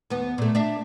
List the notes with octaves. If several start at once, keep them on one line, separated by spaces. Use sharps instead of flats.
D#2 B3
A#2 A3
D4 E5